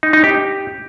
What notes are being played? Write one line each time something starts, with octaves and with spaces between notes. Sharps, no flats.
D#4
D#4
G4